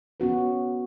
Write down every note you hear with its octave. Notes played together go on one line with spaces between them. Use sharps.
B3 C#4 F#4 B4